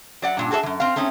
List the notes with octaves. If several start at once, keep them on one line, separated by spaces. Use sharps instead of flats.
F#3 D5 F#5
G2 A#2 D4
F#4 G#4 A4 C#5 E5
F#2 E3
C4 F5
A3 C4 C#4 D#4